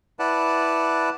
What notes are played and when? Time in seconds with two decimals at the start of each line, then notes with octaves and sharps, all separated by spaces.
0.19 E4 B4 D5 F#5 A5